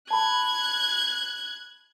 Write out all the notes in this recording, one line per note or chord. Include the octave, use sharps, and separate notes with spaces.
A5 B5 F#6 G#6